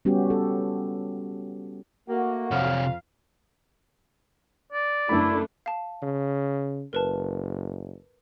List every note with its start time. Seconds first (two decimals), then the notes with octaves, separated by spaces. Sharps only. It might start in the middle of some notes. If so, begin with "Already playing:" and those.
0.05 G3 B3 C#4 F#4 G4
0.30 A4
2.08 A3 A#3 F#4
2.51 F2 C3 C#5 F5
4.72 D5
5.09 F#1 A3 D4 E4 B5
5.66 F5 A5
6.02 C#3
6.93 F#1 A#4 B4 A5